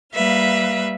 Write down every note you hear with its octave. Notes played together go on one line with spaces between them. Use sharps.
G3 A#3 B4 E5 F5